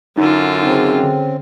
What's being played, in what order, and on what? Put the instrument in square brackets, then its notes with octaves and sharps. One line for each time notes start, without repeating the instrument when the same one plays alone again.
[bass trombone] F#2 [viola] D3 F4 [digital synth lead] D#4
[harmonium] C#3 C4 [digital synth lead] D#4
[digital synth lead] D3